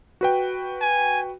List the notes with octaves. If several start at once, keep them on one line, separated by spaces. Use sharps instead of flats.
F#4 B4 G5
G#5